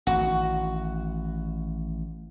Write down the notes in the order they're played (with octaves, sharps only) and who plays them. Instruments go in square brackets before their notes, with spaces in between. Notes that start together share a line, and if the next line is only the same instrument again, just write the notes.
[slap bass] A1 D#3 [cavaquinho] F#4